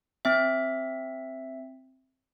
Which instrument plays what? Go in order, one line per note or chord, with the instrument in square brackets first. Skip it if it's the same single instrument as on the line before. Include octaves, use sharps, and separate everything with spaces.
[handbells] C4 E5